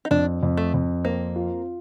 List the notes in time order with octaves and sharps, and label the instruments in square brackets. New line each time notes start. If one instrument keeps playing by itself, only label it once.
[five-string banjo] D#4
[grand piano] F2 [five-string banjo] D4
[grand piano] F2
[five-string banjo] A3
[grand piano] F2
[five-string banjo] A#3 [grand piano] C4
[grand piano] F4